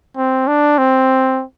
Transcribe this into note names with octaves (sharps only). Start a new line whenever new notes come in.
C4
D4
C4